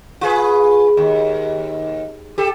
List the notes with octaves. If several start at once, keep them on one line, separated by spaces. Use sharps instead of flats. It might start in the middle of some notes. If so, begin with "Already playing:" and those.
F4 G#4 B4
D#2
G4 A4